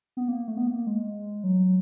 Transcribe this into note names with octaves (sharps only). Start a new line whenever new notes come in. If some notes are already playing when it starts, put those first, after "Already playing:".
B3
A#3
A3
B3
A#3
G#3
F#3